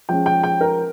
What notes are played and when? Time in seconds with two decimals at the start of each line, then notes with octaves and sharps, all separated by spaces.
0.09 F3 G#3 C#4 G5
0.26 G5
0.43 G5
0.61 A#4